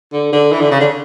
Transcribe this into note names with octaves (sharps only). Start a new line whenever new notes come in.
D3
D3
E3
D3
C#3
D3